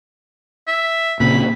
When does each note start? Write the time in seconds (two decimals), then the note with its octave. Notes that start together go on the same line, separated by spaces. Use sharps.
0.67 E5
1.20 A#2 C#3 C4 B5